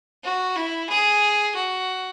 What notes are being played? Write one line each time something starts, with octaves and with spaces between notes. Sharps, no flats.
F#4
E4
G#4
F#4